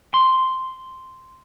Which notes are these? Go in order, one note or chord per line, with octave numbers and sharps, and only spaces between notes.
C6